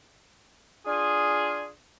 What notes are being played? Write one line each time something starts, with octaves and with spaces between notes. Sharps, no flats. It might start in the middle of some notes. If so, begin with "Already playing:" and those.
D4 F4 G#4